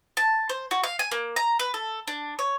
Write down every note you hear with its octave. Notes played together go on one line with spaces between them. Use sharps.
A5
C5
F#4
F5
G#5
A#3
A#5
B4
A4
D4
C#5